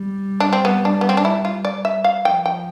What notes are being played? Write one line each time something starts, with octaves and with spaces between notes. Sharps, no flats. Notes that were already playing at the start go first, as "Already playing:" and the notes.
Already playing: G3
D4
C4
B3
D4
B3
C4
D4
E4
F4
D5
E5
F5
F3 G5
G5